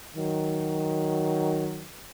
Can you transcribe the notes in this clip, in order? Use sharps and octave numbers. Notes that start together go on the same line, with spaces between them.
D#3 F#3